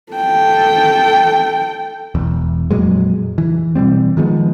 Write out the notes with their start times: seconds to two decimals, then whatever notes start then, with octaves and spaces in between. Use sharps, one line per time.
0.12 A4 G5
2.15 E1 E2
2.71 F2 A#2 F#3 G#3
3.38 E3
3.75 B2 E3 G3 C4
4.17 D#3 F3 G#3 B3